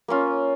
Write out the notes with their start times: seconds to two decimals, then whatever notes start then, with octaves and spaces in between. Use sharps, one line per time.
0.08 A#3 C#4 F4